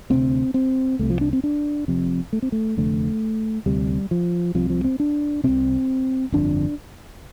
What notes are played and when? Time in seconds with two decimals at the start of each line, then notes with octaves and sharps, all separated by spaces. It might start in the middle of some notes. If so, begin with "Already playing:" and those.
0.10 D2 C3 C4
0.54 C4
0.99 C2 C3 A3
1.10 F3
1.21 D4
1.33 C4
1.44 D4
1.88 F1 F2 C3
2.33 A3
2.42 C4
2.52 A3
2.77 F1 F2 D3 A3
3.66 D2 C3 G3
4.11 F3
4.54 C2 C3 F3
4.70 F3
4.84 C4
5.00 D4
5.44 C2 C3 C4
6.32 G1 F2 D3 D4